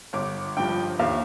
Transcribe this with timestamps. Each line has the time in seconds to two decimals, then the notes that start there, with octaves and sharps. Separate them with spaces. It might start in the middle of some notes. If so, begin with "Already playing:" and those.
0.13 G1 D6
0.57 G2 F3 G5
0.99 D#2 F5